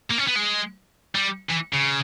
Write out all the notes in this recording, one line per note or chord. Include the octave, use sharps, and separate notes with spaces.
A#3
C#4
B3
G#3
G3
E3
C#3